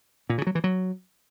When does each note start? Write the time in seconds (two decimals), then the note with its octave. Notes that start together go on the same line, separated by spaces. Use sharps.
0.29 A#2
0.38 C#3
0.47 F#3
0.55 E3
0.64 F#3